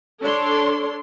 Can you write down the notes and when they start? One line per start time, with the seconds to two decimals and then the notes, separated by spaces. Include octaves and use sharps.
0.22 D4 A4 C#5 C6